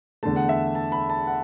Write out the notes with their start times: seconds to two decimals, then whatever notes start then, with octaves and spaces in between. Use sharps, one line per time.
0.23 E2 D3 A3 A5
0.36 F#5
0.49 E5
0.75 A5
0.92 B5
1.10 A5
1.27 F#5